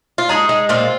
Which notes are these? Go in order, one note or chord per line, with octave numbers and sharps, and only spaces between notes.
F4
G#3 D#4 G#4
G#3
A#2 C4 F4